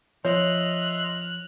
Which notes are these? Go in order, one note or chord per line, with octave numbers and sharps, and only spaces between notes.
F3 C#5 D#5 E5 C6 F6 F#6